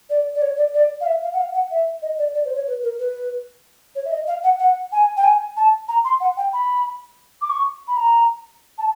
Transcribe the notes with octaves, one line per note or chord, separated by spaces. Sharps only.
D5
D5
C#5
D5
D5
F5
E5
F5
F#5
F5
F#5
E5
D#5
D5
D5
C5
C#5
B4
A#4
B4
C#5
E5
D#5
F5
F#5
F#5
G#5
G5
G#5
A5
A#5
C6
F#5
G5
B5
D6
C#6
B5
A#5
A5